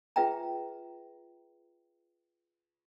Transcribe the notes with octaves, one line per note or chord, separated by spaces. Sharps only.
F4 G#4 B4 E5 G5 A#5